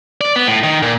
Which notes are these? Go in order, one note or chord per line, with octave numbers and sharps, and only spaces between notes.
D5
B3
A2
D#3
A#2